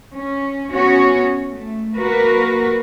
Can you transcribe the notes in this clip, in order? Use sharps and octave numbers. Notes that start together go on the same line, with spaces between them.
C#4
B3 C#4 F#4 C#5
A3
A#3 F#4 A#4 B4